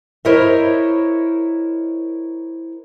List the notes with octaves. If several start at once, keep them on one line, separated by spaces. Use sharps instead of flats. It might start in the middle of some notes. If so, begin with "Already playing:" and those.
E4 A#4 C5 C#5 D#5 E5